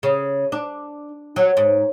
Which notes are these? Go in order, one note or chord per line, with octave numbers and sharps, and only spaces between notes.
C#3
D4
F#3
G#2